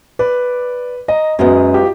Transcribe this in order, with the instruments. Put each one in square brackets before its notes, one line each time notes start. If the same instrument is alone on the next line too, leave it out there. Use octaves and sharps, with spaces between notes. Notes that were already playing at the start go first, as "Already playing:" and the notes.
[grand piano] B4 [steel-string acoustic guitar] D5
[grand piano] D#5 [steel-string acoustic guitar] A#5
[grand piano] F#2 [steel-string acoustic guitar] F#3 G#3 B3
[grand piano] F4 G4